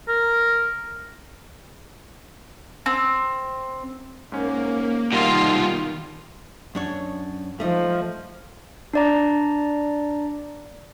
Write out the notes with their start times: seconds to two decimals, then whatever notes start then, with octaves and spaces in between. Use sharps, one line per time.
0.08 A#4
2.86 C4
4.32 G#2 A#3 C#4
5.12 C2 B2 D#3 G3 A#3 D#4 F4
6.75 F#2 D4 C#5
7.60 F3 A3 D#4
8.93 D4 D5 A#5